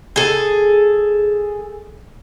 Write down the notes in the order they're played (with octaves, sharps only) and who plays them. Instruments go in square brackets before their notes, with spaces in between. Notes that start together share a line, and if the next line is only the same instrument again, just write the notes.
[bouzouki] G#4 A4